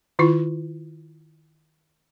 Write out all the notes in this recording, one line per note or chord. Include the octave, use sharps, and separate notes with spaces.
D#3 E4 F4